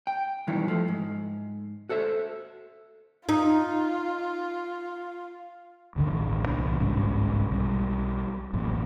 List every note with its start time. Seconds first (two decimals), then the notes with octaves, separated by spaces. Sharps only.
0.07 G5
0.47 G2 B2 D#3 E3 F#3 E4
0.68 F3 A3
0.88 G#2
1.89 F#4 A4 C5 E5
3.29 D#4 F4
5.96 G1 D2 D3 D#3
6.11 A1 D#3
6.46 C2 A#2 E3 D4
6.80 G1 C2 G#2 C#4
7.51 B1 G3
8.53 A1 F#2 A#2